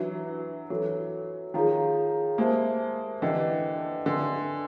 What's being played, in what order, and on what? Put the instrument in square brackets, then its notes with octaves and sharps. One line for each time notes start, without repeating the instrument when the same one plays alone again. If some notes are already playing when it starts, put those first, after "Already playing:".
Already playing: [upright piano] E3 F#3 [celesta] D4 F#4 B4 E5
[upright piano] E3 F#3 [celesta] F#4 A4 C#5
[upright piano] D#3 F3 [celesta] G#4 C#5 F5 A#5
[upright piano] G#3 A#3 [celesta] G4 C5 E5 A5
[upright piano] D3 E3 [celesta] G4 B4 D#5 G5
[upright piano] D3 [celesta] B4 E5 G#5 C6